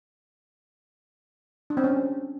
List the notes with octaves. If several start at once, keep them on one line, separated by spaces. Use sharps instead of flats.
D4
C4
C#4